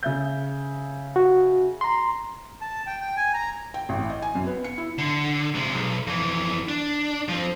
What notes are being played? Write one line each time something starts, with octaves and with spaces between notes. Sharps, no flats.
C#3 E5 G6
F#4
A#5 C6
A5
G5
G5
G#5
A#5
G5
A1
D#5
G#5
F#2
B3
C#7
E4
D3
C3 G#3
B1
F2 E3
D4
F3 C4